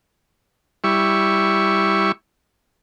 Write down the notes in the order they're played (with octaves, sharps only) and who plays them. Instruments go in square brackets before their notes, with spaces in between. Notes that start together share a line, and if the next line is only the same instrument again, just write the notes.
[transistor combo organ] G3 E4 C#6